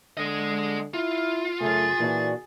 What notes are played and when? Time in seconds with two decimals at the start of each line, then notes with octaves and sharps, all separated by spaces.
0.17 D3 G#3 D#5
0.94 E4 F4
1.61 F#2 C#3 A3 G#4 A6
1.99 A#2 E3 D4 F#4